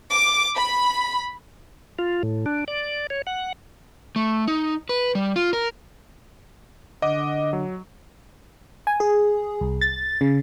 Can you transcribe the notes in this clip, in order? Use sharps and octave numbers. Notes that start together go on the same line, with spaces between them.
D6
B5
F4
A2
D4
D5
C#5
F#5
A3
D#4
B4
G3
F4
A#4
D3 D#5 F#5 D6
F#3
G#5
G#4
C2
A6
C#3